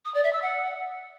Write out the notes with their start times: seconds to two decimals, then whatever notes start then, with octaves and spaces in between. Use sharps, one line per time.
0.05 D#6
0.14 D5
0.23 E5
0.33 E6
0.42 F#5